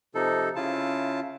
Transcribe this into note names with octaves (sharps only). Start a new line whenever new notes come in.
C3 F3 D#4 A4
C#3 E4 F4 A5